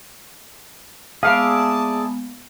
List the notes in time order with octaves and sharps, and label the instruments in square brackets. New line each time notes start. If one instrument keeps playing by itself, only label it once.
[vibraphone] G#3 A#3 B3 [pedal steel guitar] G#4 D5 E5 [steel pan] F5 [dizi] A5